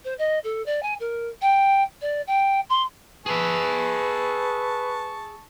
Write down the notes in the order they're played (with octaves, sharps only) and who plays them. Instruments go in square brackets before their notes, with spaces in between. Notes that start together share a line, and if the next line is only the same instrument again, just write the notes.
[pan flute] C5
D#5
A4
D5
G#5
A#4
G5
D5
G5
C6
[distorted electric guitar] G#4 E5 [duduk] B4 [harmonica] A5 C#6